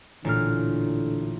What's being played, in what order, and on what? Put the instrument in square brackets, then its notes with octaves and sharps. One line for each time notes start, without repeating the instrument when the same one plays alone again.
[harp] A1 A#2 F6 [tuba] D3